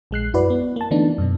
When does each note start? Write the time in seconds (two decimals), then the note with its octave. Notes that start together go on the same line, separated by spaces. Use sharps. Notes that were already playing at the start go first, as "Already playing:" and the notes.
0.11 A#1 G#3 F#6 C7
0.34 F#2 E4 F#4 B4 D5
0.50 B3
0.76 A#3 A5
0.91 D3 E3 A3 B3 D4 D#4
1.18 F#2 B2